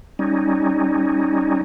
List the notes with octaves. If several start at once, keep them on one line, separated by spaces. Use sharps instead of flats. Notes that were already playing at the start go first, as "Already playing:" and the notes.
G3 C#4 D#4